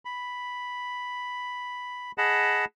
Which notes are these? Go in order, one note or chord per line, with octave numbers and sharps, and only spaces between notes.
B5
G#4 D#5 F#5 A5 B5